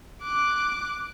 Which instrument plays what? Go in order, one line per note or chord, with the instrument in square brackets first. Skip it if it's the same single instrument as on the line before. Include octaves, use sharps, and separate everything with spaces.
[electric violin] D6 F#6